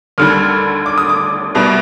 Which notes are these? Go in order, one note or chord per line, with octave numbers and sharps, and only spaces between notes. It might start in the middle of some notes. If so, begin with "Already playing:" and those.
D#2 D3 G3 F6
D6
D#6
D6
C2 B2 G3